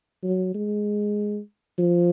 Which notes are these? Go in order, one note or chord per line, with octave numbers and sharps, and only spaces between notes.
F#3
G#3
F3